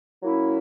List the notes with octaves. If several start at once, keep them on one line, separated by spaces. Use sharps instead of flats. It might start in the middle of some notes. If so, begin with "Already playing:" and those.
F#3 A#3 C#4 E4